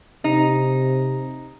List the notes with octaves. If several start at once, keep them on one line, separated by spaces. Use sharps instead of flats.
C3 D#4